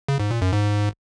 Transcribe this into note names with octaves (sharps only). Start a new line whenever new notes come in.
C#3
G#2
A#2
F#2
G#2